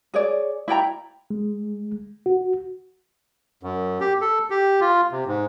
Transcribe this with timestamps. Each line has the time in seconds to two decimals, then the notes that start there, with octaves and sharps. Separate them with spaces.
0.14 G#4 C#5 D5
0.68 E4 D5 G5 A#5
1.30 G#3
2.26 F#4
3.63 F#2
4.01 G4
4.21 A4
4.50 G4
4.81 F4
5.12 C3
5.27 G#2